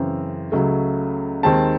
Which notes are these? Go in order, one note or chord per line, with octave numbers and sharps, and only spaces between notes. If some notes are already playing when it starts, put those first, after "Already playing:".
Already playing: F#2 C#3 E3 C4
C#2 C#3 F#3 A3
D#2 D#3 G#3 C4 A5